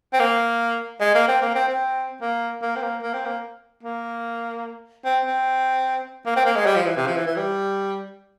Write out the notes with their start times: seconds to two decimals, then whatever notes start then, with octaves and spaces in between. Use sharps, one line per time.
0.13 C4
0.20 A#3
1.00 G#3
1.15 A#3
1.28 C4
1.42 A#3
1.55 C4
1.68 C4
2.22 A#3
2.62 A#3
2.76 C4
2.82 A#3
3.02 A#3
3.14 C4
3.26 A#3
3.83 A#3
5.05 C4
5.25 C4
6.26 A#3
6.36 C4
6.45 A#3
6.56 G#3
6.66 G3
6.76 F3
6.86 E3
6.97 C3
7.07 F3
7.16 E3
7.26 E3
7.36 G3